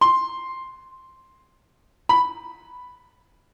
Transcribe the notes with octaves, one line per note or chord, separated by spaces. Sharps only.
C6
B5